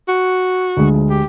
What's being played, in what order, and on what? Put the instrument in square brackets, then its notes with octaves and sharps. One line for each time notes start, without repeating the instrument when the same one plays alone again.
[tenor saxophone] F#4
[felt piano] D2 G#3
[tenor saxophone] F3
G4